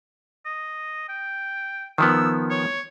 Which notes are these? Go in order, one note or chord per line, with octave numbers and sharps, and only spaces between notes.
D#5
G5
D#3 F3 B3 E6
C#5